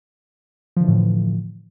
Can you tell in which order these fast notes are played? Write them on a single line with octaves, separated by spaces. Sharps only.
F3 D3 E3 A2